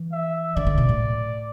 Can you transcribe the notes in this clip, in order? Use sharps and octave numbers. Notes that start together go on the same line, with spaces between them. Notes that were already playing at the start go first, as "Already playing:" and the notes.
Already playing: E3
E5
D3 D5
D3
B2
A2